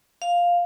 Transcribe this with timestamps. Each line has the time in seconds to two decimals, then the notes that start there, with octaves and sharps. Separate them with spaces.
0.22 F5